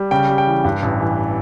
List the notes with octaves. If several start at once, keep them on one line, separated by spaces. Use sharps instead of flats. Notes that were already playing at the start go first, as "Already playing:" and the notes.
Already playing: G3
C#3 G5
G3
G5
E3
G2
A1
E3